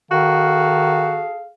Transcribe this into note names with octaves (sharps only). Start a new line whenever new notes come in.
D#3 F#4 G#4 A4 F5